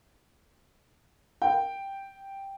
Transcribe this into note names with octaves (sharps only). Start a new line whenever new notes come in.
G5